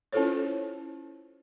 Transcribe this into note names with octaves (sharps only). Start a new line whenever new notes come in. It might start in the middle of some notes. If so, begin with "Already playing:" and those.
C#4 E4 F4 A4 C5 C#5